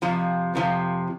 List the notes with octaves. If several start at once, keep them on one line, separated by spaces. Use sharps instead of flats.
F2 C3 F3
F2 C3 F3